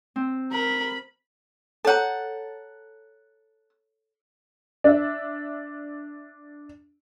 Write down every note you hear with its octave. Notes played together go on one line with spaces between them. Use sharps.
C4
A#4 B5
A4 C#5 F#5 A5 A#5
D4 E5